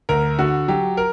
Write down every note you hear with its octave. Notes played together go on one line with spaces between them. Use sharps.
D2 A#4
D3 F#4
F#3 G4
A#4